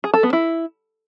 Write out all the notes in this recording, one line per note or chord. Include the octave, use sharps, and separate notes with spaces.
G#4
A4
B3
E4